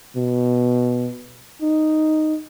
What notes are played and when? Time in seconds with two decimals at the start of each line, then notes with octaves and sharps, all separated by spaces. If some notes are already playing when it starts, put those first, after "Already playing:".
0.17 B2
1.62 D#4